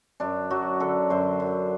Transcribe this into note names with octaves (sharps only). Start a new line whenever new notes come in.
F#2 D4
F#3 F#4
D3 A4
F#2 C5
F#2